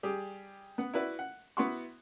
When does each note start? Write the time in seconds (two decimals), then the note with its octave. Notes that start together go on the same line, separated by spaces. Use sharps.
0.03 G3 G4 G#4
0.78 B3 F#5
0.94 E4 F#4 B4 D5 E5
1.19 F#5
1.57 B3 E4 F#4 F#5 C6 C#6